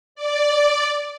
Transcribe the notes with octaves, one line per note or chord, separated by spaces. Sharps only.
D5